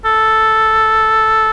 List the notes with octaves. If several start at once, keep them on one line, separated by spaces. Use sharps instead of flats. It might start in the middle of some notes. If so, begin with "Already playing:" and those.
A4